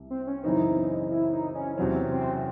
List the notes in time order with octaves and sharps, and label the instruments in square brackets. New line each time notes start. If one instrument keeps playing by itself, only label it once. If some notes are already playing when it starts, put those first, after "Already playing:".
Already playing: [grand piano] C2 C3
[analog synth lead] C4
C#4
[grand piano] F#2 C#3 E3 C4 [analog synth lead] D#4
[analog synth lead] E4
D#4
C#4
[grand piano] E2 C3 F#3 C#4 [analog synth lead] C4
[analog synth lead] C4